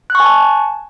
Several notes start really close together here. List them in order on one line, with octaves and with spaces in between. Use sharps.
F#6 C#6 G#5 A5